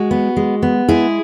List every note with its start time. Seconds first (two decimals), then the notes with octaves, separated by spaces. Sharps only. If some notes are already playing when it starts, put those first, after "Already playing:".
Already playing: G#3 F#4
0.11 B3
0.36 G#3
0.63 B3
0.88 G#3 E4 G#4